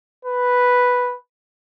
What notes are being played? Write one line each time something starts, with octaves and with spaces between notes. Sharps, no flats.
B4